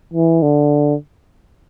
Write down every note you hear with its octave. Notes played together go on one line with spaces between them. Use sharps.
E3
D3